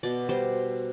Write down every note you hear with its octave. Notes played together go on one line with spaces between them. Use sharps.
B2 D5
G3 C5